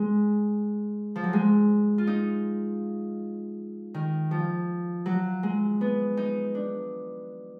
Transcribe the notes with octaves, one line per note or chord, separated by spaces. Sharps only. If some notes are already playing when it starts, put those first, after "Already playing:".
Already playing: G#3
F3
F#3
G#3
F4
D#4
D#3
F3
F#3
G#3
B3
D#4
D4